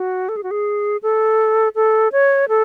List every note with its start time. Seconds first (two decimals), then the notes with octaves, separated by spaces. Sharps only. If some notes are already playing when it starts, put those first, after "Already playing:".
Already playing: F#4
0.29 A4
0.36 G#4
0.43 F#4
0.51 G#4
1.03 A4
1.75 A4
2.12 C#5
2.49 A4